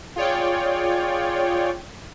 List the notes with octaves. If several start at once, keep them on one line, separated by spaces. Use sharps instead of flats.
F4 G#4 C#5 D5 G5